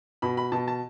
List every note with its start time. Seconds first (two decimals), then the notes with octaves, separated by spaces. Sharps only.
0.22 B2 B5
0.37 B5
0.52 B2 A5
0.68 A5